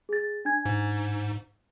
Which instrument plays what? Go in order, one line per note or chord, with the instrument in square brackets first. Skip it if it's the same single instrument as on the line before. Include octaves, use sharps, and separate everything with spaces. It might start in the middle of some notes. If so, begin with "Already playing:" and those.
[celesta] G#4 A6
D4 G#5 G#6
[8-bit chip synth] G#2